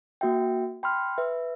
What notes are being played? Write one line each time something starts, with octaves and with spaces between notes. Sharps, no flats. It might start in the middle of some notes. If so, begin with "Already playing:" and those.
A#3 F#4 E5 G5
G5 B5 C6 F6
B4 E5